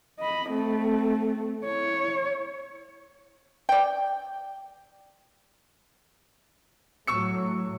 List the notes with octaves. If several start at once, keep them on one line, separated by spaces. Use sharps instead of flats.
D#5 B5
A3 C4
E4 C#5
D5 G5
A2 F#3 C#6 E6 C#7